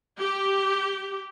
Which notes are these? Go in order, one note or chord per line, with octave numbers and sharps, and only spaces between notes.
G4